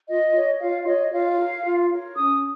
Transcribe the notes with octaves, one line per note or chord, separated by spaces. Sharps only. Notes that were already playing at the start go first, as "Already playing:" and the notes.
F4 D#5
C#5
F4 F5
C#5 D#5
F4 F5
A#4 C#5
F4
A#4 C#5
C#4 D#6